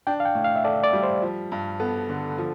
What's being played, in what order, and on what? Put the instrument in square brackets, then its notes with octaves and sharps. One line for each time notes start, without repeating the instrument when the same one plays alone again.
[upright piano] D4 [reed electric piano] G5
[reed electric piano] F5
G5
[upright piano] A2
[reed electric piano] F5
E5
[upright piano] A4 [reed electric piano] D5
[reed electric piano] D5
[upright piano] G3
[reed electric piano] C5
[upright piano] F3
G2
[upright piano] B3 [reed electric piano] A4
[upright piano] D3
F3